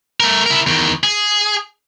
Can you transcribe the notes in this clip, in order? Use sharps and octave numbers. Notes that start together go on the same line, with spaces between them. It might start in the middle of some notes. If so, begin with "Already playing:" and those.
A3 A#4
E4 A#4
E2 D#3
G#4